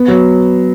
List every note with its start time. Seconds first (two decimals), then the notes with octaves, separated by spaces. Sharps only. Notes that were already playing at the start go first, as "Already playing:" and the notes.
Already playing: B3
0.08 F#3